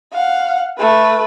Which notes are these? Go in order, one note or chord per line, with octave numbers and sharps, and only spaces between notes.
F5 F#5
A3 B4